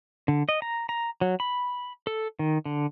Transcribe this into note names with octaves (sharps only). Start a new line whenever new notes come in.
D3
D#5
A#5
A#5
F#3
B5
A4
D#3
D3